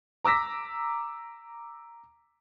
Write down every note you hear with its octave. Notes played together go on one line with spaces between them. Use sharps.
A#5 D6 E6 A#6 B6